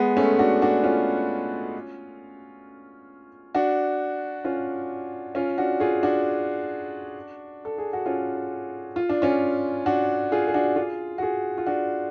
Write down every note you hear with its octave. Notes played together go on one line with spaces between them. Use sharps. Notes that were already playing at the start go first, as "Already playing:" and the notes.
Already playing: G#3 B3
A3 C#4
D4 F#4
D4 F#4
C#4 F4
D4 F#4
C#4 F4
C#4 F4
D4 F#4
F4 G#4
D4 F#4
A4
G#4
F#4
C#4 F4
F4
D4
C#4 F4
D4 F#4
F4 G#4
G#4
D4 F#4
F4 G#4
F#4
F4 G#4
F4
D4 F#4